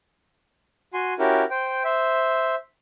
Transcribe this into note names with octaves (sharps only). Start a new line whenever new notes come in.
F#4 G#5 C6
C#4 E4 F#4 G4 A#4
C5 G5
C5 E5